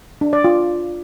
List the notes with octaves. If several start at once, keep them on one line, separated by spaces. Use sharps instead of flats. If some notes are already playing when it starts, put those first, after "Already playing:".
D4
D5
F4